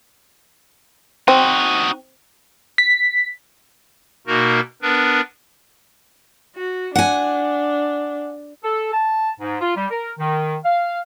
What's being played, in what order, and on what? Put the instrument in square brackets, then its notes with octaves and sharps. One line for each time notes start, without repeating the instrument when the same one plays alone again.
[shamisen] C4 [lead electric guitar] D#4 F#4
[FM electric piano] B6
[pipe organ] B2 A#3 D#4 F#4 A#4
B3 D4 A#4 B4
[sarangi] F#4
[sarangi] D4 [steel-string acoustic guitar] F#5 G#5
[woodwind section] A4
A5
G#2
F4
G3
A#4
D#3
F5